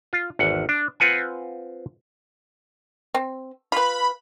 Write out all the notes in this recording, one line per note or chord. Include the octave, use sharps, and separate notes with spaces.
F4
G#1 E2 F#5
D4
C4 F4 B4 F#5 G#5
C4
F4 B4 B5